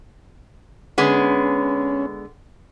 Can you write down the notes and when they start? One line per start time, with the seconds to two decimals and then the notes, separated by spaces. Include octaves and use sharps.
0.98 D3 G#3 B3 C#4